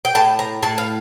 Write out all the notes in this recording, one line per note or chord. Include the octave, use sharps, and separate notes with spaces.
G5
A2 A5
A#5
A2 A5
F5